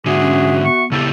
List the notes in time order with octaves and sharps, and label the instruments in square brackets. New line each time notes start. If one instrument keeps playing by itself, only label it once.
[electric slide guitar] G#2 D3 [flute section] F#4 E5 F#5 [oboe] G#4
[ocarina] C#4
[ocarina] B3 [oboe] C#6
[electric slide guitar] C#3 E4 G4 [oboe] A4